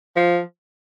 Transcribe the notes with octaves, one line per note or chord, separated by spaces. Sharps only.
F3